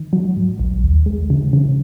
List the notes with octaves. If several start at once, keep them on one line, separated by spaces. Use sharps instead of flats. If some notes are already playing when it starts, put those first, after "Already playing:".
Already playing: D#3
F#3
G#2
A#1
D#2
G#3
C#3
C#3